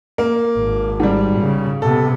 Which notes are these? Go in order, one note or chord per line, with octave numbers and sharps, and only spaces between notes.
A#3
G#1
G#2 G3
C#3
C3 B3 A4